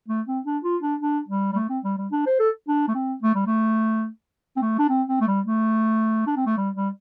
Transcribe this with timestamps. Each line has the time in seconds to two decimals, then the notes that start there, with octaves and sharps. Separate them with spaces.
0.08 A3
0.27 C4
0.45 D4
0.64 F4
0.82 D4
1.01 D4
1.28 G3
1.52 G3
1.56 A3
1.70 C4
1.84 G3
1.98 G3
2.12 D4
2.26 C5
2.40 A4
2.68 D4
2.88 A3
2.95 C4
3.23 A3
3.35 G3
3.47 A3
4.57 C4
4.62 A3
4.79 D4
4.90 C4
5.08 C4
5.21 A3
5.28 G3
5.46 A3
6.27 D4
6.37 C4
6.47 A3
6.57 G3
6.76 G3